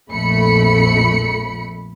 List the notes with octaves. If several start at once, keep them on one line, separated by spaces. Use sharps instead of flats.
A#1 F2 A3 B5 C#7